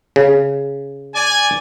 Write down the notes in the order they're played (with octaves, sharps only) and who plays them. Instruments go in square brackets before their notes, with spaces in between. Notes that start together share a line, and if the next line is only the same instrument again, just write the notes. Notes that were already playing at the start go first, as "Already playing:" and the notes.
[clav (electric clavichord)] C#3
[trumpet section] D5 G#5